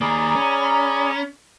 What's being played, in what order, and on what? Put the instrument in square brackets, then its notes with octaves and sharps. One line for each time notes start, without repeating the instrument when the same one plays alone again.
[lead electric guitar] D#3 A#3 [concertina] G#4 D5 [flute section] A#5 B5
[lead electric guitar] C#4